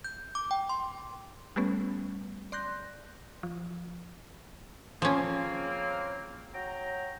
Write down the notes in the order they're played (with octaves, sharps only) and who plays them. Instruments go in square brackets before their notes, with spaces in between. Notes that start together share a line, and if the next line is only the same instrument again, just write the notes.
[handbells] G6
D6
G5
C6
[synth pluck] G3 A3 B3 C#4
D5 C6 F#6 G6 A#6
F3
[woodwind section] C#3 A#3 C4 [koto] F3 C#4
[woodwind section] F#3 G5 A#5